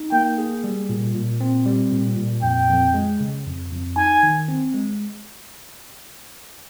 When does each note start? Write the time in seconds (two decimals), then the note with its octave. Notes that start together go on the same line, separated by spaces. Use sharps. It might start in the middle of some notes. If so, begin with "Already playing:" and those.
Already playing: D#4
0.12 A#3 G5
0.38 G#4
0.64 G3
0.89 A#2
1.15 A#2
1.41 C4
1.66 G3
1.92 A#2
2.17 A#2
2.43 F2 G5
2.69 F2
2.94 G#3
3.20 C#3
3.46 F2
3.71 F2
3.96 D#4 G#5
4.23 D#3
4.48 C4
4.74 G#3